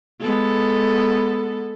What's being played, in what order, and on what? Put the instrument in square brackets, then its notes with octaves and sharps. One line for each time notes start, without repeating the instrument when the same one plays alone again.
[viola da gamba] G#3 B3 A4